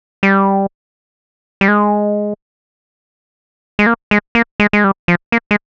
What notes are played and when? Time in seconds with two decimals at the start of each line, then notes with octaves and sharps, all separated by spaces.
0.23 G3
1.61 G3
1.68 G#3
3.79 G#3
3.87 A#3
4.11 G#3
4.35 A#3
4.60 G#3
4.73 G#3
4.84 G3
5.08 F3
5.32 A#3
5.51 G#3